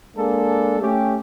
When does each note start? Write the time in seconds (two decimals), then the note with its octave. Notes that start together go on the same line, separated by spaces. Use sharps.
0.15 G#3 A#3 D4 A4
0.80 A3 C#4 G4